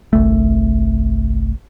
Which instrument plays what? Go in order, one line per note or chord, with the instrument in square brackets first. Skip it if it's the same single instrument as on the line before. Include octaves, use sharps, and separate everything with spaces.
[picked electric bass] G1 C2 A3